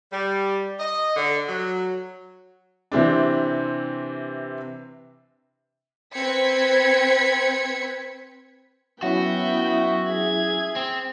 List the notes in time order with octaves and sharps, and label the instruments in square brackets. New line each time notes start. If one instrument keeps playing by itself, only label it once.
[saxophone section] G3
D#5
D3
F#3
[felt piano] C3 E3 C4 D4
[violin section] C4 B4 G#6 B6 C#7
[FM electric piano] F#3 C#4 E4 [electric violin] B3 G5 [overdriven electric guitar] F#4 [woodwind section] E5
[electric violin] G#4 G#6
[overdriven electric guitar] C4